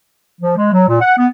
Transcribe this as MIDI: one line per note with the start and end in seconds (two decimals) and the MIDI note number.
0.41 0.56 53
0.57 0.69 56
0.72 0.86 54
0.88 0.98 46
1.01 1.13 78
1.18 1.27 59